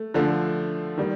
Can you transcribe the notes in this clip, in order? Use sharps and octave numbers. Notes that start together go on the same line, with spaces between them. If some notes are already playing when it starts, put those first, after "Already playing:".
Already playing: A3
D3 F3 A3
D#3 G3